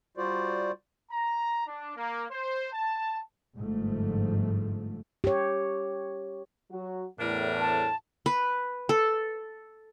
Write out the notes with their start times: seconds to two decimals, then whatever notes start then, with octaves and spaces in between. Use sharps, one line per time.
0.17 G3 F4 F#4 C5 D5
1.11 A#5
1.67 D4
1.97 A#3
2.31 C5
2.73 A5
3.58 G1 G#2 F3 A3
5.24 G4 C#5
6.71 F#3 F#4
7.19 E2 A2 G3 D4 A#4
7.61 A5
8.26 B4
8.89 A4